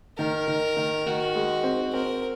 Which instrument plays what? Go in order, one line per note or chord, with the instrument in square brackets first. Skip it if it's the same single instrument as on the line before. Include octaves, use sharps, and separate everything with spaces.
[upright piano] D#3 [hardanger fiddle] A#4
[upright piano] D#3
D#3
[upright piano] D#3 [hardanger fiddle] F#4
[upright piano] G#3
C4
[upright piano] C4 [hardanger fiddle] A#4